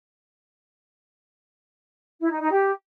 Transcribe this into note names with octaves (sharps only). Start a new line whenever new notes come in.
E4
D#4
D#4
G4